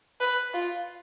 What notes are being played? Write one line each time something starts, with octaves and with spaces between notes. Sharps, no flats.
B4
F4